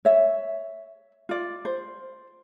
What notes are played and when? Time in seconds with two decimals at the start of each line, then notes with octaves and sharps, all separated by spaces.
0.05 C#5 E5
1.29 F4 D5
1.65 C5